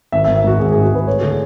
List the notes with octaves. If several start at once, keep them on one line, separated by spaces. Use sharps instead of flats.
G#1 E5
E5
G#1
E5
G#2 F#4
G#1 G#4
G#2 G#4
F#4
G#1 B4
A3 C#5
D3 F#4
G#4